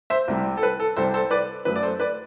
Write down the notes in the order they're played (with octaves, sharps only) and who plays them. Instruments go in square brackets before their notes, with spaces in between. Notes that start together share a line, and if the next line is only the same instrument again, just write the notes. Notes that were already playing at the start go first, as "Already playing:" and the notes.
[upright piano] C5 E5
C2 C3 G3
A4
B4
A4
C2 C3 G3 A4 C5
A4 C5
B4 D5
F#2 F#3 A3 B4
D5
A4 C5
B4 D5